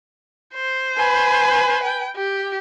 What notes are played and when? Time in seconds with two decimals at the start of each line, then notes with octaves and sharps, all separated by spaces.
0.54 C5
0.96 B4 G#5
1.83 G5
2.16 G4